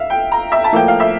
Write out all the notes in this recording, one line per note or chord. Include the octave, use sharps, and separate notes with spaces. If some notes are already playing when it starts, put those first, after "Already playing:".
Already playing: E5 F5
G5
A#5
E5
A5
A2 F3 A#3 G5
F5
E5